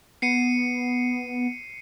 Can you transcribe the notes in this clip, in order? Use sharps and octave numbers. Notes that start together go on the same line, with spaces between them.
B3 C7 C#7 D#7